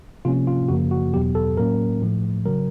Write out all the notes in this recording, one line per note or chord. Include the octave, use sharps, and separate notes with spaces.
C3 F3 A#3 C#4 F4
F4
F#2 C#3 F3 A#3 F#4
F#4
E2 B2 F#3 B3 G4
A4
A2 F#3 A#3 C#4 A#4
A2 F3 A3
C#3 F#3 A#4